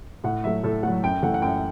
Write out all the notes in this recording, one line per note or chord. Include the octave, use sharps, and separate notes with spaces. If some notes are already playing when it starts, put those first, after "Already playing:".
A2 F#5
F#3 A3 E5
A2 A4
F#3 A3 F#5
F#2 G5
E3 A3 F#5
F#5
F#2 G5